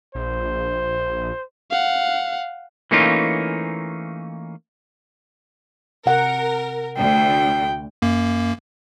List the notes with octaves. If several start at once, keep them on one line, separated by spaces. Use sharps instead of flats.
A#1 C5
F5 F#5
E3 A3 A#3 C#4 D#4 F4
C3 A#4 F#5
D2 G5
F#2 A#3